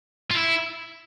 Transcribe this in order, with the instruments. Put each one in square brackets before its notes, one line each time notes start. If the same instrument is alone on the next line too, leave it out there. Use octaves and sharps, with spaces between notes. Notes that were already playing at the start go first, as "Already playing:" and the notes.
[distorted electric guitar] F4
E4